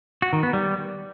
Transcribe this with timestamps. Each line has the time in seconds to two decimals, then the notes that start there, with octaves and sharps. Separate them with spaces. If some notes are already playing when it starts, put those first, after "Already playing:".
0.22 F#4
0.33 D#3
0.43 B3
0.53 G3